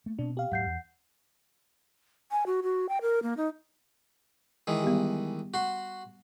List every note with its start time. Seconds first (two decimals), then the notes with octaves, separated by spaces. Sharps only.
0.06 A3 A#3
0.19 B2 C4 D4
0.37 G4 F5
0.52 D#1 G#2 F#3 F#5 G6 C7
0.66 E2
2.31 G#5
2.46 F#4
2.63 F#4
2.89 G5
3.02 A#4
3.23 A#3
3.37 D#4
4.67 D#3 E3 G#3
4.83 G3 B3 G4
5.54 F#4 C6